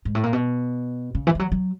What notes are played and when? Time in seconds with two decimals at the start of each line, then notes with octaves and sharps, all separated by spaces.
0.05 G#2
0.15 A2
0.23 A#2
0.33 B2
1.15 C#3
1.27 E3
1.35 F3
1.39 F#3
1.52 F#3